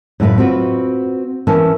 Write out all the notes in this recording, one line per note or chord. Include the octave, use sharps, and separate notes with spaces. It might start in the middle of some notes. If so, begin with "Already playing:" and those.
F#2 A2 C#3 A#4 B4
C4 F4 F#4 B4
E3 C#4 A#4 A5